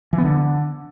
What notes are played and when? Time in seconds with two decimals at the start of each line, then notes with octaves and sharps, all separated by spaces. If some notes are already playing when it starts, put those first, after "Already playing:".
0.13 E3
0.18 B3
0.23 D3